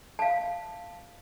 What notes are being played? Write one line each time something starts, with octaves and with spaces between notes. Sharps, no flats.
F5 A5